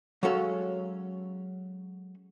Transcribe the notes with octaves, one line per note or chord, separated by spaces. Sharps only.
F#3 G#3 C#4 A4 F5